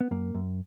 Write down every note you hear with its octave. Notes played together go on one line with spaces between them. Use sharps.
B3
F#2 A#3
F#2